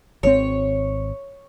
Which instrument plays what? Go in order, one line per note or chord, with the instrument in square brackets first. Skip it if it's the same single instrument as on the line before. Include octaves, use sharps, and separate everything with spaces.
[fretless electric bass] G#1 D3 C4 [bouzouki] C#5